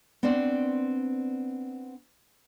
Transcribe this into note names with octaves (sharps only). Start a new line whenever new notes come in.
B3 C4 D4 C5 D5